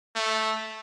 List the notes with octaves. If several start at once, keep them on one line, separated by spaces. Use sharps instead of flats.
A3